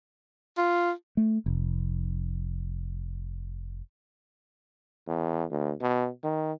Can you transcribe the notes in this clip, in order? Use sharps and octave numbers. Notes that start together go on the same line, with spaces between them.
F4
A3
F1
E2
D2
B2
D#3